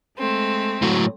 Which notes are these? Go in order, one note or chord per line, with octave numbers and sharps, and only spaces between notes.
G#3 A3 C4
A2 F#3